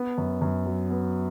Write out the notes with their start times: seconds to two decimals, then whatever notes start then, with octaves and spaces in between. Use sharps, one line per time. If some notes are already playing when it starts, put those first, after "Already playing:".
Already playing: B3
0.18 F#2
0.42 F#2
0.66 F#3
0.90 B3